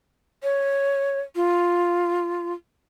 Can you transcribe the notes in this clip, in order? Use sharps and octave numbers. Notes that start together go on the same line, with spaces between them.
C#5
F4